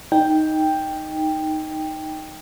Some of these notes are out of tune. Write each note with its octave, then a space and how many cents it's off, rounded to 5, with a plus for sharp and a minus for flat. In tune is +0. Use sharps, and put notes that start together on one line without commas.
D#4 +0 G5 +5